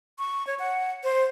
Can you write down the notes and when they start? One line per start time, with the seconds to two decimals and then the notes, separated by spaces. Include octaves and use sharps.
0.18 C#6
0.47 C#5
0.59 F#5
1.04 C5